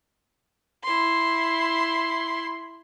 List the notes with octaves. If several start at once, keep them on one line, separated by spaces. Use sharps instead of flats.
E4 C6